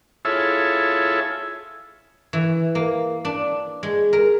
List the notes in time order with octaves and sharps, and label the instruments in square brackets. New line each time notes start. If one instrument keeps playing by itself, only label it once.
[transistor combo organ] E4 F4 G#4 A4 C#5 E5
[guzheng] E3
A#3
D4
G#3
A#4